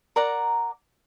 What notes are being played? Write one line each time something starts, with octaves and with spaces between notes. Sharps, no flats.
A#4 D5 F#5 A#5